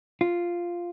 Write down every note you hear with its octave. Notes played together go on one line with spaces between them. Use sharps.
F4